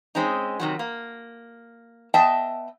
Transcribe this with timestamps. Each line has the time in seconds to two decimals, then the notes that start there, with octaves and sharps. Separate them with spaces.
0.15 G#3 C4 C#4 D#4
0.60 C3 D#3 F#3
0.79 A#3
2.14 B3 D#5 E5 G5 A5